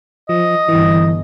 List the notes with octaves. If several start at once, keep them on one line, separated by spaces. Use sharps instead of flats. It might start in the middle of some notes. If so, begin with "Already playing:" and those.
F3 D#5
G1 E3